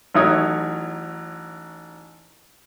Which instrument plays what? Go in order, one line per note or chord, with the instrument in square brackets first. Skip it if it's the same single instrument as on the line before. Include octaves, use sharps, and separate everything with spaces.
[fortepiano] A1 F#3 D#4 E4 C#5 D#6